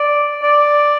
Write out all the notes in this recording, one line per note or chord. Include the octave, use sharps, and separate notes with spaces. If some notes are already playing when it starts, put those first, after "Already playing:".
Already playing: D5
D5